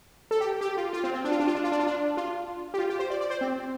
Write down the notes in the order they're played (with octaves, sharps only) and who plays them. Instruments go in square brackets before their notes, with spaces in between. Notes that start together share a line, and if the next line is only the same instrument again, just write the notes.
[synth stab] A4
G4
G4
F4
F4
C4
C4
D4
F4
D4
F4
D4
F4
D4
F4
D4
F4
G4
F4
G4
C5
D5
D5
C5
C4